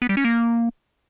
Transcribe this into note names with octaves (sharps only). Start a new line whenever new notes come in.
B3
G3
C#4
A#3